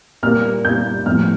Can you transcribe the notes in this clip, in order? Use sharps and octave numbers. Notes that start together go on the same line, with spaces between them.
A#2 G3 A#3 F6
A#2 G3 A#3 G6
A2 F3 A3 F6